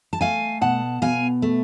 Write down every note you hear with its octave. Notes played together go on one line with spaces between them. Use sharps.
A5
A3 F5 G#5
B2 F#5 A5
B2 F5 G#5
A3